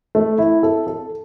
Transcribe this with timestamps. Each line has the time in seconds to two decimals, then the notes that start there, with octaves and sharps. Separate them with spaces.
0.15 A3
0.38 E4
0.63 A4
0.87 A4